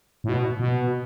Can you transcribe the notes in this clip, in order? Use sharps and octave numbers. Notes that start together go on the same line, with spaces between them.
A2
B2
B2